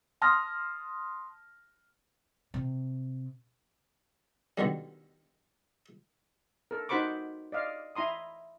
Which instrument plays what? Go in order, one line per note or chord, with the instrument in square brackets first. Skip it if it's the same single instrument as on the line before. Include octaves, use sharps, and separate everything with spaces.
[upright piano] A5 C6 D#6 F6 A#6
[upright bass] C3
[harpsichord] B2 D3 D#3 G3
[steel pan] A4 A#4
D#4 F#4 C5 B5 C#6 D6
D5 D#5 F5
E4 A#5 C6 D#6